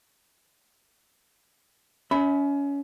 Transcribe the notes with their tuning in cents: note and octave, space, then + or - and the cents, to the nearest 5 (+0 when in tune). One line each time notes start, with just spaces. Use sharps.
C#4 +25 E5 -35 B5 +10